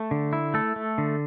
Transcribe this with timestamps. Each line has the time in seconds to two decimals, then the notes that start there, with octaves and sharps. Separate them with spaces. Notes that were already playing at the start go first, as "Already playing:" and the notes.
Already playing: A3 A4
0.11 D3
0.33 E4
0.54 A3 A4
0.76 A3
0.98 D3